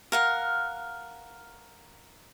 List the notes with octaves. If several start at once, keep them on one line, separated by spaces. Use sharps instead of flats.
A#4 F5 F#5